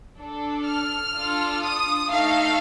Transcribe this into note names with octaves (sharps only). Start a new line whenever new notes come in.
D4 A4
F6
D4 F4 A4
D#6
A3 D#4 A4 F5